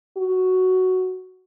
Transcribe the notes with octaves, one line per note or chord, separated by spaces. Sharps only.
F#4